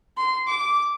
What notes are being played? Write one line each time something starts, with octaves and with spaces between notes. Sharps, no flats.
C6
D6